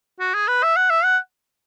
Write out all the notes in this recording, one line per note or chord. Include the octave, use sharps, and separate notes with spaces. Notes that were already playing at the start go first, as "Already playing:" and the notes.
F#4
G#4
B4
E5
F#5
E5
F#5